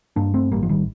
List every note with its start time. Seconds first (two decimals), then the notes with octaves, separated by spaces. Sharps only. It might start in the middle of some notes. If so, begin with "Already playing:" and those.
0.16 G2 A#3 D4
0.34 A3 C4
0.52 A1 G3 A#3
0.63 F3
0.69 D#3 G3